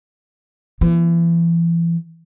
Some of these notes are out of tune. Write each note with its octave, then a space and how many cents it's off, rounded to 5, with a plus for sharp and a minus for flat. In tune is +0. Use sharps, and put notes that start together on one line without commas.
E3 +35 B3 -35